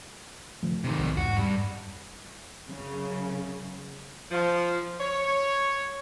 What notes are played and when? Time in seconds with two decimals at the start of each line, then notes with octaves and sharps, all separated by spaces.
0.63 C#3 F3 A3
0.84 C3 D#3
0.98 B1
1.17 E2 G#2 F#4
1.37 G2
2.68 F#2 C#3
4.31 F3
5.01 C#5